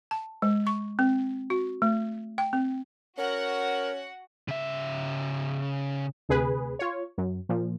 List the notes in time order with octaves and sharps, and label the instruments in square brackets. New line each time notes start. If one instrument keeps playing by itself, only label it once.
[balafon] A5
G#3
C#6
C4
F#4
A3
G5
C4
[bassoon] C#4 [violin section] F#4 F#5 [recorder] A#4
[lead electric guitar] C#3 E5
[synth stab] D2 C3 G#4 B4
F4 C#5
F#2
A#2 F3